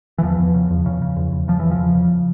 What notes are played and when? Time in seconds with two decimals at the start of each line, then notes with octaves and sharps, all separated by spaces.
0.18 E3
0.23 E2 F3
0.39 E2
0.54 C#3
0.71 E2
0.86 C#3
1.02 C#3
1.16 E2
1.32 E2
1.48 C#3 F3
1.59 E2 E3
1.71 F3
1.79 E2
1.95 C#3